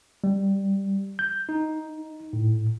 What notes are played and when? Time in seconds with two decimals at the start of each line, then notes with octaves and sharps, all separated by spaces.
0.24 G3
1.19 G6
1.49 D#4
2.33 A2